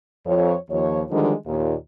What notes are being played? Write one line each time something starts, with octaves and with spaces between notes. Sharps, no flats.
F2 C#5
D#2 F3 C#5
D3 D#3 F3 G3 G#3 D4
D#2 A#2